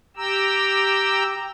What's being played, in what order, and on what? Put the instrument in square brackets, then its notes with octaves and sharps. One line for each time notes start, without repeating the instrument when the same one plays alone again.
[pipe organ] G4 G5 A#5 E6